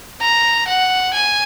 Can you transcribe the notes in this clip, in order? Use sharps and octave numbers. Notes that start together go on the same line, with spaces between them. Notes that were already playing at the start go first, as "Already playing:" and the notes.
A#5
F#5
G#5